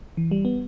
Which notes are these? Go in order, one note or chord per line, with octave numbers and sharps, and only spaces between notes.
E3
G3
B3